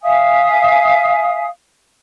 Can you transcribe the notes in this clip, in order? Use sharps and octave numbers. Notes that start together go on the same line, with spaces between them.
E5 F5 G#5 D#6